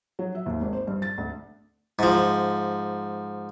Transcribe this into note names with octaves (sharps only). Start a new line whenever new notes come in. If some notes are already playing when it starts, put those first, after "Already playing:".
F#3
E5
D#2
G#1
C5
G2
A6
D2
G#2 F3